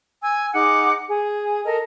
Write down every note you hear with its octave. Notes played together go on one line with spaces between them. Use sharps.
G#5 E6
D#4 G#4 F#5 D6
G#4
A4 A#4 D#5